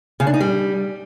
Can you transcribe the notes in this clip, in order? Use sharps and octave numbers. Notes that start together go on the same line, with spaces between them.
C#3
D4
D#4
G3